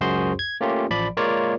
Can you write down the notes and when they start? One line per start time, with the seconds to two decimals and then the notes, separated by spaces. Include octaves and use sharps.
0.01 C#2 F#2 F#4 G#4 C5 C6
0.39 G#6
0.61 A3 A#3 C#4 F4 G4
0.90 A1 F3 D5 B5
1.17 G#3 A#3 F4 A#4 C#5 D5